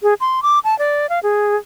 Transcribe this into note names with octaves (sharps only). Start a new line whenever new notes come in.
G#4
C6
D6
A5
D5
F5
G#4